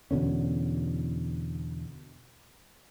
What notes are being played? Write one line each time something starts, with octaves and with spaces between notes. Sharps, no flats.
E2 B2 D3 C#4